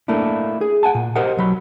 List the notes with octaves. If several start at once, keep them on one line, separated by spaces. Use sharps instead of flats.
A3 A#3 D4 E4
G#4
F#5 G#5 A5
A#2
G4 A#4 C5 D#5 F#5
B1 F#3 B5